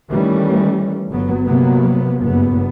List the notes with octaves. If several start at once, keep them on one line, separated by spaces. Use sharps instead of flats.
D#3 E3 G3 A3 C#4
G1 F#3 B3
C3 F#3 A#3 B3
F#1 G2 B3